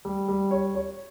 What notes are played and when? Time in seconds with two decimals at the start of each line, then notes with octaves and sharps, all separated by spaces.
0.05 G3
0.28 G3
0.51 C#5
0.75 C#5